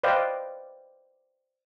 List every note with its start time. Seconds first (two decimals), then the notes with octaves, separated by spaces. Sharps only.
0.03 B4 C5 D5 D#5 F5 G5